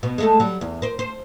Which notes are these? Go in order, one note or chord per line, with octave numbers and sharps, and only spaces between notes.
B2
G#3 A3 A4
F#3 G3
E2
A#4 C5
C5